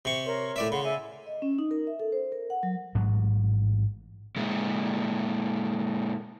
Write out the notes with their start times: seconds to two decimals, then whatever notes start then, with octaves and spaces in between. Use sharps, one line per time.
0.05 C3 C#6
0.25 A#4 C#5 C6
0.56 A2 D5 E5
0.72 C#3 F#5 B5 C6
0.84 D5 E5 G#5
1.27 D#5
1.42 C#4
1.58 D#4
1.71 A#4
1.87 E5
2.00 A4
2.12 C5
2.32 A#4
2.50 F#5
2.63 F#3
2.95 A1 G#2 F#3
4.36 A#2 G#3